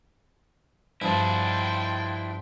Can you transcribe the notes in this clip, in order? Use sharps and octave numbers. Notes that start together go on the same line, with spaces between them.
G2 F3 D4 E4 G5 C6